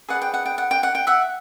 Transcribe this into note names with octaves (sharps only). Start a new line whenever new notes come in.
G#4 B4 D5 F#5
G5
F#5
G5
F#5
G5
F#5
G5
E5 F#5